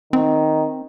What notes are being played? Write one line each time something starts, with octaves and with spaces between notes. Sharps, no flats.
D#3 C4